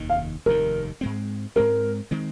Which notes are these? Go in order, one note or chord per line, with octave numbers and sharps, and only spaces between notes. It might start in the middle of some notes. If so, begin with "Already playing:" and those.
Already playing: F1 D#2 D#3
F5
F1 D#2 D#3 A#4
G#2 G#3 C4
G#2 G#3 C4 A#4
D#3 G#3 C4